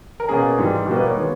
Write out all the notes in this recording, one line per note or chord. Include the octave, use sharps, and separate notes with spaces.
A#4
B2 A#3 C#4 G#4
G#2 E3 G3
B2 G3 A#3
B4
C#5
D#3 G#3 B3